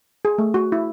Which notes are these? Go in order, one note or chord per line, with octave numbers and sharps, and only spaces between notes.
G#4
A3
F#4
E4